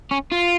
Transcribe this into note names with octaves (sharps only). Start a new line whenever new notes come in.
C#4
F4